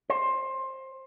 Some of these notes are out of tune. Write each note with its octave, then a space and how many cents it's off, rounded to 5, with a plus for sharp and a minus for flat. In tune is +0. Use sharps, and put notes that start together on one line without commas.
C5 +20